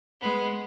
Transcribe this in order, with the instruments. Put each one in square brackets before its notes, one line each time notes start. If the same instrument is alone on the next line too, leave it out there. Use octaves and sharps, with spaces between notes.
[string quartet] G#3 B3